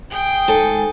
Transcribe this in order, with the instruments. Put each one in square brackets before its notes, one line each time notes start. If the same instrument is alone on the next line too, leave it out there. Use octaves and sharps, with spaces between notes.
[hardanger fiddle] G#4 G5
[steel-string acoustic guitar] G#2 A4 G#5